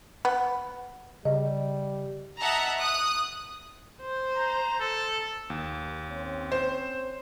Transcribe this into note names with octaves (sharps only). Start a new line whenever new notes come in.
B3
C#3 G3 D#5
D#5 E5 F#5 A5 A#5
D#6 F#6
C5
A#5
A4
D#2
C4 C#4 C#5
C5